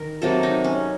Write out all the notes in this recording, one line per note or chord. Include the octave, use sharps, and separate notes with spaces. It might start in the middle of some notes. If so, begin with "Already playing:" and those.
Already playing: D#3 A#4
C3 F#3 A#3 A4
D#4
C#4